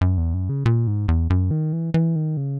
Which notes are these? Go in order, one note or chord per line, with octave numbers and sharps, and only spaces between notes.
F#2
E2
F#2
C#3
A#2
G#2
E2
F#2
D#3
E3
E3
D#3
C#3